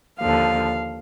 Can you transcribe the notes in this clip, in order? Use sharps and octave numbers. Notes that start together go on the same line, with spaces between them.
D#2 D3 F3 F5